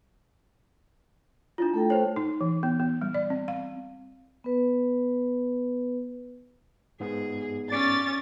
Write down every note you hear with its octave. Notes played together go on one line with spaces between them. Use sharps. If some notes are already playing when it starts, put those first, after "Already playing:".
D4 E4 F4
A3 A4 G5
C5 C#5
D#4
E3
B3
B3
G3
D5
C4
F5
B3 B4
G#2 B3 G#4
C#4 D5 A6